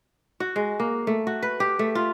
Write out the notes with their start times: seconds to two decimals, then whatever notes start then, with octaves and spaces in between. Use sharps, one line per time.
0.40 F#4
0.56 G#3
0.80 A#3
1.07 A3
1.27 F#4
1.43 B4
1.60 G4
1.79 A3
1.95 F4